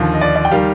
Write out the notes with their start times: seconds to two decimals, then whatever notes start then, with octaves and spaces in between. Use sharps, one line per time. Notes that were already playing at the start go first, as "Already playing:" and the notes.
Already playing: D#2 D3 F3
0.14 D#5
0.21 D5
0.36 D5
0.45 G5
0.51 D#3 G3 F5